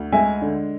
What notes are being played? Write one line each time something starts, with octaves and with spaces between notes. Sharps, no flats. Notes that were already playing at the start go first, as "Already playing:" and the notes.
Already playing: D2
G#3 E5 G#5
D3